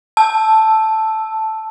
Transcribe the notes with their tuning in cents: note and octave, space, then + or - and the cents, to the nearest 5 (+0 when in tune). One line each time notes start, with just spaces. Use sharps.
A5 +0 E6 +0